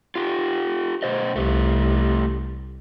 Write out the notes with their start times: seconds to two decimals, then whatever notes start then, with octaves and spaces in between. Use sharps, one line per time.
0.15 F4 G4
1.02 B2 C5 D#5
1.36 C2 A3 G4